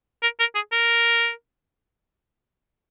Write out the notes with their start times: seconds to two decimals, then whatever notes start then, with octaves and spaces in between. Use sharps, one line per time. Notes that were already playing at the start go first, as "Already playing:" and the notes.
0.23 A#4
0.40 A#4
0.55 G#4
0.72 A#4